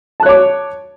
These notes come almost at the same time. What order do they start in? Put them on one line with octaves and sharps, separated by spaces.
A5 F#6 C#5 D6